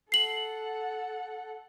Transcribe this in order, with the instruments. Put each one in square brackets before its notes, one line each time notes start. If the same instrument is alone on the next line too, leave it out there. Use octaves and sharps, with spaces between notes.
[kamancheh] A4 F#5 [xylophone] C7 F#7